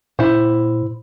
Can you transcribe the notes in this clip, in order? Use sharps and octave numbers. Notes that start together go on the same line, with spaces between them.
A#2 E4 C5